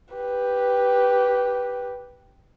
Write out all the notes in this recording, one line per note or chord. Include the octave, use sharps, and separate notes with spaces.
G4 B4